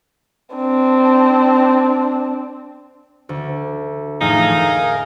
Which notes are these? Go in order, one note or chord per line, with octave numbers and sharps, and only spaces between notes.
C4 D4
D2
F2 A2 E3 D#4 G#4 F5
A#4